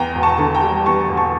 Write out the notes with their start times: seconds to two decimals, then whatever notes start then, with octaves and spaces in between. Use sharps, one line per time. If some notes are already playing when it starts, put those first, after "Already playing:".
Already playing: E2 G5 A#5
0.15 E1
0.23 A5 C#6
0.39 D3
0.54 G5 A#5
0.62 G3
0.86 E2 A5 C#6
1.09 E1
1.17 A5 C#6